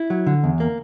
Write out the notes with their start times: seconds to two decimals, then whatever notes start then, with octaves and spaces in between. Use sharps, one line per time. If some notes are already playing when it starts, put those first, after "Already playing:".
Already playing: E4
0.10 F#3
0.27 D3
0.44 E2
0.60 A#3